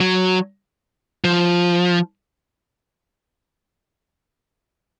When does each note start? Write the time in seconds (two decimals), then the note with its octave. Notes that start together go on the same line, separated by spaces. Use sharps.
0.01 F#3
1.24 F3